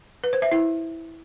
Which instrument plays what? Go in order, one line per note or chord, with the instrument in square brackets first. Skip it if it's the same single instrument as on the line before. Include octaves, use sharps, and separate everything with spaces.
[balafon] B4
C5
E5
E4